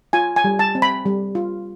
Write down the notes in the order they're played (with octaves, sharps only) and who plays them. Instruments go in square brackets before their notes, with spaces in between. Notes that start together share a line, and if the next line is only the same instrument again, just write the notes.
[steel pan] F4 G#5
G#5
G3
A5
C4
B5
G3
F4